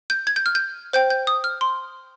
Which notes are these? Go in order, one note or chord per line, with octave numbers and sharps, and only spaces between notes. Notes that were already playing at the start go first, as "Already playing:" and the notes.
G6
G#6
G6
F6
G6
C5 G5 G6
G6
D#6
F6
C6